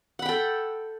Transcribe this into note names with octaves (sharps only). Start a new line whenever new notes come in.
A4 F#5 G5 B5